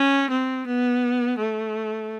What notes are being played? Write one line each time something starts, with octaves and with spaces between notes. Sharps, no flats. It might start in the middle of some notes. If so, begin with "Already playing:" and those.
Already playing: C#4
C4
B3
A3